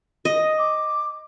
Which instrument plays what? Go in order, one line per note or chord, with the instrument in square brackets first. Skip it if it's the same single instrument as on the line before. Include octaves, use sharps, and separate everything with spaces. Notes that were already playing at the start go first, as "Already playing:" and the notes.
[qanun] D#5
[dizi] D6